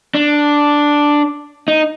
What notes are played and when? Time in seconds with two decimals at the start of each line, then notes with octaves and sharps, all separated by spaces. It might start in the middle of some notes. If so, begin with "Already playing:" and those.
0.15 D4
1.68 D#4